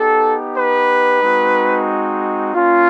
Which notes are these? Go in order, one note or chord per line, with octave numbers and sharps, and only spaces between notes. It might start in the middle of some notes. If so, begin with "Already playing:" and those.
Already playing: B3 D#4 G4 A4
B4
G#3 C4 D#4 F#4
A#3 C#4 F4